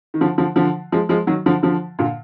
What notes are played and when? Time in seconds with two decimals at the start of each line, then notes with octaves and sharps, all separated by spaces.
0.14 D#3
0.21 D3 F3
0.38 D3 F3
0.56 D3 F3
0.92 F3 G#3
1.09 F3 G#3
1.27 D#3 F#3
1.46 D3 F3
1.63 D3 F3
1.99 A#2 D3